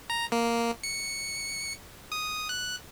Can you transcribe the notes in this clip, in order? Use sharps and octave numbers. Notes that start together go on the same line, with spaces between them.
A#5
A#3
C#7
D#6
F#6